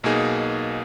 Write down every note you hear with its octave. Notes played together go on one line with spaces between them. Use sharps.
B1 B2 A#3 D#4 G#4